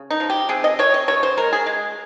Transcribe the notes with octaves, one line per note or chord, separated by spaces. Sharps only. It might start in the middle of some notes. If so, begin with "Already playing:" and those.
Already playing: C#3
D#4
F3
G4
C3 G#4
D#5
C3 C#5
D#5
C#3 C#5
C5
G#3 A#4
G#4
G#3